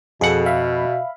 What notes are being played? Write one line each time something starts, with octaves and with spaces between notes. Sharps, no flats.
F2 B2 G#4 A4 F#5
E5 F5 B5